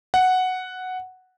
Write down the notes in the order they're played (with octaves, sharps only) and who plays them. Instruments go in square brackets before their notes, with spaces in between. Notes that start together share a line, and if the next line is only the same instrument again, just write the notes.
[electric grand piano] F#5